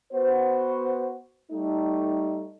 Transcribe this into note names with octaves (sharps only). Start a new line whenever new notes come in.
B3 F#4 C5
G3 A3 D#4